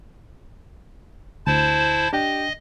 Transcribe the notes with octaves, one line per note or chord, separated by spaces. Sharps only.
D2 E4 C5 A5
D4 G4 D#5 G5